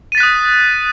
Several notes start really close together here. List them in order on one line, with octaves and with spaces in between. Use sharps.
D#7 A6 B6 F#6 D#6